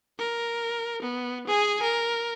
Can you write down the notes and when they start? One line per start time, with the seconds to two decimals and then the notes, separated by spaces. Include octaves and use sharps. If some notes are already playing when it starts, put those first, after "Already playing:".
0.19 A#4
1.02 B3
1.47 G#4 G#5
1.82 A#4